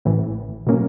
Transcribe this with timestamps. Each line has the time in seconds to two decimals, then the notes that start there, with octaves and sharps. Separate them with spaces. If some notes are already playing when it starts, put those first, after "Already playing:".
0.05 A1 A2 E3
0.67 B2 F#3 A#3 C#4